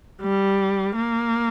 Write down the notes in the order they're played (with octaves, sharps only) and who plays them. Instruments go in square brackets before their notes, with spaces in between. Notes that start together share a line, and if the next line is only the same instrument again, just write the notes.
[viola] G3
A#3